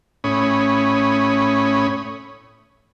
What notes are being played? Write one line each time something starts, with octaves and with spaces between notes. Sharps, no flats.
A2 C#4 C#5 B5 D#6